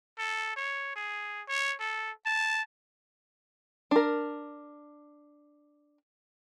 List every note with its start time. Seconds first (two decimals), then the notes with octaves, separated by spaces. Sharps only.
0.19 A4
0.56 C#5
0.96 G#4
1.48 C#5
1.80 A4
2.26 A5
3.91 D4 A#4